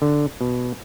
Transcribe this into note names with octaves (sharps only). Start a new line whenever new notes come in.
D3
B2